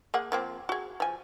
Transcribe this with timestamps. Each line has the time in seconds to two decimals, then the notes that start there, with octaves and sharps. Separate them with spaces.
0.14 A#3 G#4 F#5
0.32 F3 A#3 C4
0.69 F#4 G#4
1.00 F3 G#5